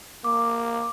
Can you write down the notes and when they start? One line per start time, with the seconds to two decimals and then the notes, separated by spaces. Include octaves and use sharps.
0.24 A#3 D6